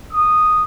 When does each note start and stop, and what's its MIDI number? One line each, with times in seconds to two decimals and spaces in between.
0.12 0.63 87